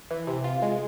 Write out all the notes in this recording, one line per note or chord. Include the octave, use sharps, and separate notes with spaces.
E3
C3
F4
G#3